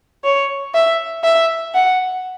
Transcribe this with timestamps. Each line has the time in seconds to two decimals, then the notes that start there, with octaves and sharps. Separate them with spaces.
0.24 C#5
0.75 E5
1.24 E5
1.75 F#5